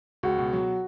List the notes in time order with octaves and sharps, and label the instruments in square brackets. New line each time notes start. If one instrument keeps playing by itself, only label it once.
[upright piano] C#2 [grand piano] F#4
[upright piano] B2
F#3